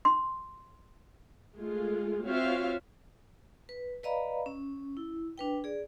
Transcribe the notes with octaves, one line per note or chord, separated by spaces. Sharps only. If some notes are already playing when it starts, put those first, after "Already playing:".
C6
G#3 A3 F4 G#4
C4 F4 F#4 C#5 E5 F5
B4
B4 D5 D#5 F5 A#5 B5
C#4
E4
D4 B4 G5
G#4 D5